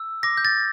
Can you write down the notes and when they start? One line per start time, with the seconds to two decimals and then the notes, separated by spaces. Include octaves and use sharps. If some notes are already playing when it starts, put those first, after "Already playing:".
Already playing: E6
0.23 D6 A#6
0.37 G6
0.45 A6